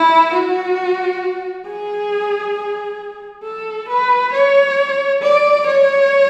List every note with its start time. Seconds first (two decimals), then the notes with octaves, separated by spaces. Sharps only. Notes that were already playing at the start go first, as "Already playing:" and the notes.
Already playing: E4
0.33 F#4
1.66 G#4
3.43 A4
3.88 B4
4.33 C#5
5.21 D5
5.66 C#5